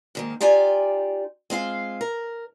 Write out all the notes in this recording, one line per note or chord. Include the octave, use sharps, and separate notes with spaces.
G#2 D#3 A#3
D#4 F4 G4 D5 G#5
G#3 C4 F4 F5
A#4